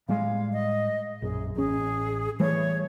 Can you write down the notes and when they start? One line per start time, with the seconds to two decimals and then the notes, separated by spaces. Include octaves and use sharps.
0.09 A2 G3 G#3 F5
0.53 D#5
1.22 A#1 F#2 G#4
1.56 A1 C#4 G#4
2.40 E3 G3 A3 C#5